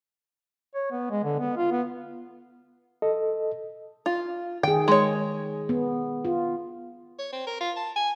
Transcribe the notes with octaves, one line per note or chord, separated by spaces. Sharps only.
C#5
B3
G#3
D3
B3
F4
B3
A4 D#5
F4
D#3 G#4 G5
G#3 C#5
B3
F4
C#5
C4
A#4
F4
A5
G#5